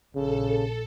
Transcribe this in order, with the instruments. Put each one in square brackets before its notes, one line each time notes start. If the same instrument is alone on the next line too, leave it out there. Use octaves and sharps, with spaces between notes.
[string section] A#1 [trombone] C#3 [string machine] A4